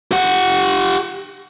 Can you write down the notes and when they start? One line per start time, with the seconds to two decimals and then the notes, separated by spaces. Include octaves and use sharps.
0.11 G4 F#5